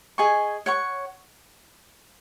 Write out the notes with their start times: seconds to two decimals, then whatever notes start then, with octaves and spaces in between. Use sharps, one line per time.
0.18 G#4 D#5 G#5 C#6
0.66 C#5 F#5 C#6